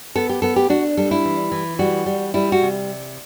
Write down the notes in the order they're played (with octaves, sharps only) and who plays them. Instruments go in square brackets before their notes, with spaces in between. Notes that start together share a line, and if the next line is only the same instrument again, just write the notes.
[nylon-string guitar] B3 A4
G4
B3 A4
G4
D4 F#4
G3 A4
E4
E3
E3
G3 F#4
G3
G3 E4
F#4
C3